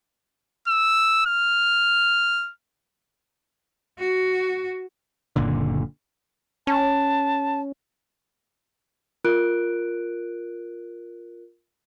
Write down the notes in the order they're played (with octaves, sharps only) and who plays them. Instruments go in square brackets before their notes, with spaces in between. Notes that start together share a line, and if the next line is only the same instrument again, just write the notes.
[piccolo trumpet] E6
F6
[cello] F#4
[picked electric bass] F#1 A#2 D3
[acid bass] C#4 [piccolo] A5
[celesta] F4 A#4 F#6 D7